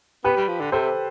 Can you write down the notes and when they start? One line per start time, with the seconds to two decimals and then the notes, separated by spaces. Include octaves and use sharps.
0.24 B3 G4 B4
0.37 G3
0.48 F3
0.60 D3
0.72 C3 A4 C5